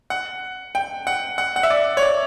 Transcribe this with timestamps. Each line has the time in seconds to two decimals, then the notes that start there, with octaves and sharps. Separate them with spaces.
0.10 F#5
0.75 G5
1.07 F#5
1.38 F#5
1.56 F#5
1.63 E5
1.70 D5
1.97 C#5
2.03 D5